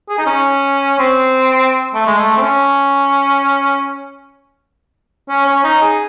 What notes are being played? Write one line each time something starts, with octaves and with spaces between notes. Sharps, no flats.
G#4
D#4
C#4
C4
A3
G#3
A3
C4
C#4
C#4
C#4
D#4
G#4